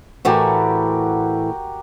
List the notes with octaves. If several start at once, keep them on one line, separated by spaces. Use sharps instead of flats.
A2 E3 A3 F#4 G4 A#4